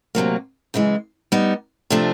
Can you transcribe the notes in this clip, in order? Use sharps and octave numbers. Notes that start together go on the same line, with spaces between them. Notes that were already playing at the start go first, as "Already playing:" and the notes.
D2 C3 D#3 F#3 A#3
F#2 C#3 E3 G#3
G3 B3 D#4
C3 F3 A3 D4